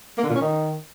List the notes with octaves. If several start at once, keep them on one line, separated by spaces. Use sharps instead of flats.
A#3
D3
A#2
C#4
D#3